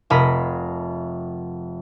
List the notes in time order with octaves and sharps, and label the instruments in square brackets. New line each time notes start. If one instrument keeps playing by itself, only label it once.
[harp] F1 F4 A#4 D#5 B5